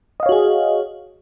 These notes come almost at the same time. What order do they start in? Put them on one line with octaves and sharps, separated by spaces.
D#5 F5 C#5 F#4 G#4